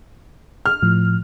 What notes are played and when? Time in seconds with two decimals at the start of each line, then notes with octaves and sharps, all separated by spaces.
0.66 F6
0.83 A2 F3